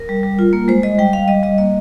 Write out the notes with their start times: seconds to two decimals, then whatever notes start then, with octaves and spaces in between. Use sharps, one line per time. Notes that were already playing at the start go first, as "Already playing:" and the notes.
Already playing: A#4
0.09 G3
0.23 G3
0.39 F4
0.53 A#3
0.68 G#3 C5
0.83 G#3 D#5
0.98 G3 G5
1.13 G3 F5
1.28 G3 D#5
1.43 G3 D#5
1.58 A#3 D#5